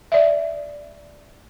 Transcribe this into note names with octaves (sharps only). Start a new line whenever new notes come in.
D5 E5